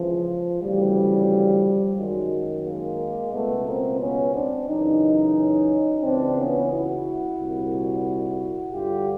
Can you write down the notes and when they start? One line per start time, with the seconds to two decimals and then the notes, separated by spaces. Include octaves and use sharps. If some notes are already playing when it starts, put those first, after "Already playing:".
Already playing: C#2 C#3 E3 F3
0.61 D2 C#3 E3 F3 G3
1.96 F#2 D#3 F#3 G#3
2.64 G#3 A#3
3.31 C#2 B2 A3 B3
3.66 A#3 C4
3.99 B3 C#4
4.33 C4 D4
4.67 F#2 C#3 E3 C#4 D#4
6.02 C#2 C#3 E3 C4 D4
6.36 B3 C#4
6.70 E4 F#4
7.38 C2 A#2
8.73 G2 D3 F4 G4